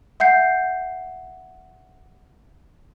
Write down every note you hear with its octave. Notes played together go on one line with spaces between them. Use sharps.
E5 F#5 G6 C7